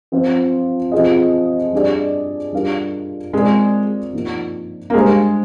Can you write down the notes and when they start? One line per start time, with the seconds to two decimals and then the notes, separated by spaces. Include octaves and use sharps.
0.12 F3 C4 F4
0.92 F3 C4 F4 G#4 D#5
1.72 G3 D4 G#4 D5
2.53 G3 D4 F4 A#4 F5
3.33 G#3 C4 F4 A#4 D5
4.13 F3 A#3 D#4
4.90 A#3
4.94 G3 G#3 D4 G#4 C5 F5